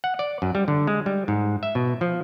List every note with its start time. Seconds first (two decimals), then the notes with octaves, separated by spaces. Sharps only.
0.04 F#5
0.19 D5
0.42 F#2
0.55 G3
0.68 D3
0.87 G#3
1.06 G3
1.28 G#2
1.63 E5
1.75 B2
2.01 F3